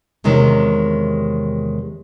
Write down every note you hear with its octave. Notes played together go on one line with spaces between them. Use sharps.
E2 C3 D#3 G#3 C#5